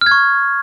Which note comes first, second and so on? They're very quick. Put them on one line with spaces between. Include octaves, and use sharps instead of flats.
F6 G#6 C#6